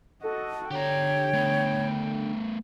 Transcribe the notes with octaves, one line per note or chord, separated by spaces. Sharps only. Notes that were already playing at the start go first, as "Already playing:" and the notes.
F#4 A4 D#5
D3 G4 C#5 G5 A#5
A3 B3